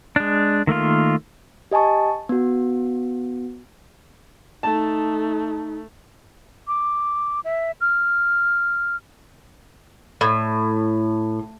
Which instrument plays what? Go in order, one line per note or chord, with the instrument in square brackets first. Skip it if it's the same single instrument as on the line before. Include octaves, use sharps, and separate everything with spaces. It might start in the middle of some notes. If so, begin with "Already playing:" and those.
[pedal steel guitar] G#3 D4
D#3 A3 A#3 F4
[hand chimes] G4 D#5 G#5 A5 C#6
B3 F#4
[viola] A3 [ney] D#4 [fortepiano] A5
[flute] D6
E5
F6
[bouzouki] A2